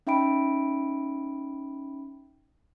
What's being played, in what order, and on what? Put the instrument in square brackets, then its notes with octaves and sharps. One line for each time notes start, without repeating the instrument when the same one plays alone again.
[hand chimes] C#4 D#4 E5 G5 B5 D7